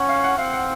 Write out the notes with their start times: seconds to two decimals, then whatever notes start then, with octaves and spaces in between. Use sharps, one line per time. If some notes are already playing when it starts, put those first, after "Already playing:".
Already playing: C#4 F#5
0.09 F5
0.24 F#5
0.38 C4 F5
0.53 F#5